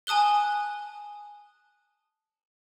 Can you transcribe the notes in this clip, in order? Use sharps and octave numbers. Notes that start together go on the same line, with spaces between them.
G#5 A5 D#6 F#6 G7